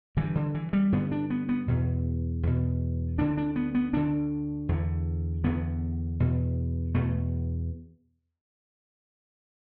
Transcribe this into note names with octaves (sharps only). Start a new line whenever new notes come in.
G2 D3 E3
D3
E3
G3
G2 D3 B3
D4
B3
B3
E2 B2
E2 B2
D2 D3 D4
D4
B3
B3
D2 D3 D4
E2 D3
E2 D3 B3
E2 B2
E2 B2 A3